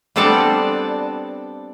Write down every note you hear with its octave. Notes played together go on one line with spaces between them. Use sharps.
G3 B3 C4 D4 A4 D5